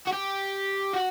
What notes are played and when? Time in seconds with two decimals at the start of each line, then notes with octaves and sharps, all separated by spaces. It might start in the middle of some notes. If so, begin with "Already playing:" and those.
0.07 F#4
0.13 G4
0.93 F#4